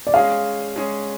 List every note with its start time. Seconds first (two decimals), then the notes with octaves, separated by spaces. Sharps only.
0.07 D5
0.14 G#3 C#4 G#4 F5
0.76 G#3 C#4 G#4